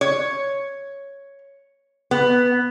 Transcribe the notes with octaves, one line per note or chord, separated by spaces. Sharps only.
C#5
B3